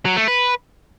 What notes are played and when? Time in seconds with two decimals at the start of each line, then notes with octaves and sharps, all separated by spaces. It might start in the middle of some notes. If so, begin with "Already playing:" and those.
0.05 F#3
0.16 A3
0.28 B4